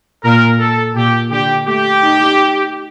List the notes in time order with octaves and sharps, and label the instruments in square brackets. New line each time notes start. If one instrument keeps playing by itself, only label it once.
[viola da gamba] A#2 [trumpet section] A#4
[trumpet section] A4
[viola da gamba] A#2 [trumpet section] G4
[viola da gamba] D3 [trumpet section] G4
[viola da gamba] A3 [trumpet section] G4
[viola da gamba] D#4